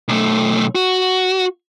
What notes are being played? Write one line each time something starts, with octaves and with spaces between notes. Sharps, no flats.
B1 A3
F#4